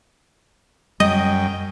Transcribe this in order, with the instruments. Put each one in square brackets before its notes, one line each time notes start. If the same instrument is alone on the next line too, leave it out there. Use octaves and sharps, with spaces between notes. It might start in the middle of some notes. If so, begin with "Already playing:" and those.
[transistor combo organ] F#2 G5 [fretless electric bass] G3 [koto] D#5